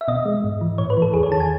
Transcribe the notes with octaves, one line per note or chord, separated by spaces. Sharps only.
E5
B2 D#5
G#3
G#2
E3
A2 C#5
B4
E3
A4
E2 G#4
C#5
D#3 A5
G#5